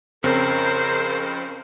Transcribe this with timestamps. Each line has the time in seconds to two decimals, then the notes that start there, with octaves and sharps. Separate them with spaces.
0.24 F2 C#3 C4 A#4 C5